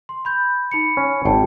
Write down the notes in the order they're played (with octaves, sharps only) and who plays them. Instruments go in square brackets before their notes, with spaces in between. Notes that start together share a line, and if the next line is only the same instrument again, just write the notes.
[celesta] C6
B5 G6
D#4 B5 C#7
[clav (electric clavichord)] C#4
[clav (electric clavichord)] G#1 [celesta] G5 A5